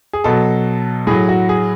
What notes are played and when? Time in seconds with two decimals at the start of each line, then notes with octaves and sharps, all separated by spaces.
0.13 G#4
0.24 B2 F#3 A4
1.07 A2 F#3 G#4
1.29 F#4
1.49 G#4